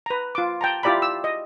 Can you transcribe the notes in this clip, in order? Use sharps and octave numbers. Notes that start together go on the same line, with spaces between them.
B4 A#5
F4 D6
G5 A5 A#5
E4 F4 G4 D5 A#5 B5
E6
D#5